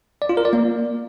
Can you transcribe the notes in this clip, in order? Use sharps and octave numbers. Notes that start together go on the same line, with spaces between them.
D5
F4
A#4
D5
A#3